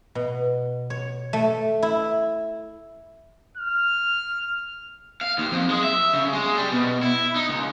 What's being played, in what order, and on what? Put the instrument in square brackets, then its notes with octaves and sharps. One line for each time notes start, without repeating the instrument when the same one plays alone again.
[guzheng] B2
C#5
A3
E4
[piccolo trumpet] F6
[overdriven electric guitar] F5
D#2
F2
G#3
E5
C#3
G#3
G3
B2
E4
D#4
C#2